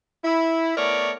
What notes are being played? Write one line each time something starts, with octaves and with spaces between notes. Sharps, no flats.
E4
A3 B3 A#4 C#5 D5